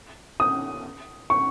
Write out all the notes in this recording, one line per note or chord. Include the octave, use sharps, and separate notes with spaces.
D#6
C#6